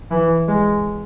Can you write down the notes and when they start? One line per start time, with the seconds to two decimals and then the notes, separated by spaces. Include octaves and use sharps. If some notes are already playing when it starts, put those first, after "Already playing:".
0.11 E3
0.48 G#3